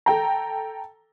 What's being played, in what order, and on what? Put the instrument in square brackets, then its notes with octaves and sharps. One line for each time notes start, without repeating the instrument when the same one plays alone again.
[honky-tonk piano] A4 G5 A#5